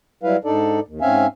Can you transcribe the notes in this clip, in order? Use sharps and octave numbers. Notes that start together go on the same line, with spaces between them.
F#3 G3 E4 B4 F5
G#2 D4 D#4 A4 D5
D#2
G#2 C4 C#4 E5 F5 G#5